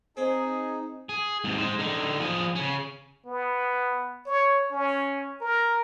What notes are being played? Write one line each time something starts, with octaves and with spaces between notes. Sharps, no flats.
C4 D#4 G#4
G#4
G#2 C3
G#3 C5
D3 D#4
F3 G#4
C#3 C#4
B3
C#5
C#4
A#4